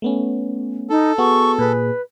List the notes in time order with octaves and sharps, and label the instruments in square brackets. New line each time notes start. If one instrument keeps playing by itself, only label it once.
[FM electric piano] A3 B3 C#4
[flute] D#4 [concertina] A4
[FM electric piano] B3 F#4 G#4 [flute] C#6
[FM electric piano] A#2 G#4 [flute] B4